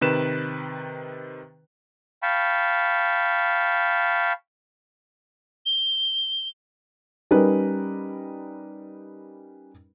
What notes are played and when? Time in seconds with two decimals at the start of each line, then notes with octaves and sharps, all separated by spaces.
0.01 C3 D#3 B4 E7
2.23 F5 G5 A5 B5 C#6
5.66 G7
7.31 G3 C#4 D#4 A#4 B4